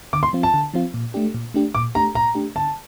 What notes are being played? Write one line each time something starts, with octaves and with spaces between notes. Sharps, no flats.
D3 D6
C6
F3 C4 F4
A5
D3
F3 C4 F4
A#2
A3 D4 G4
A#2
A3 D4 G4
A#2 D6
A3 D4 G4 A#5
A#2 A#5
A3 D4 G4
D3 A5